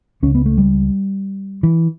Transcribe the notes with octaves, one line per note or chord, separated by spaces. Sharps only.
C#2 C#3 C#4
B3
A3
G3
E3